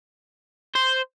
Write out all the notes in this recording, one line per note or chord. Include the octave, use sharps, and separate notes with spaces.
C5